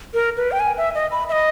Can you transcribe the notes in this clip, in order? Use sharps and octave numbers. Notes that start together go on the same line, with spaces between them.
A#4
B4
G5
G#5
E5
D#5
B5
E5
D#5